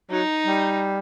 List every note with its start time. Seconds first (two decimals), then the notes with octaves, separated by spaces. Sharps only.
0.11 F#3 D#4
0.47 G3